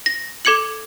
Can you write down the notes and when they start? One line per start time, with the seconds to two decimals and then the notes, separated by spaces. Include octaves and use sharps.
0.06 A#6
0.45 A4 D6 G#6 C#7 F#7